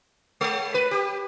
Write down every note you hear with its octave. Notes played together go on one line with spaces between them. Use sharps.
G#3
B4
G4